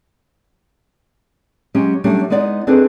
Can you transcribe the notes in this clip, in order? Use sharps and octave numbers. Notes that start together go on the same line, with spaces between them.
F#3 G#3 C#4 G4
F#3 G3 A3 C#4 D4 G4
G#3 B3 D#4 D5 D#5
C4 D4 D#4 G#4 A4 B4